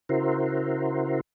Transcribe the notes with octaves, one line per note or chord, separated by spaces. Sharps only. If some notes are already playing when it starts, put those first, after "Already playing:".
C#3 E4 F#4 A#4 C5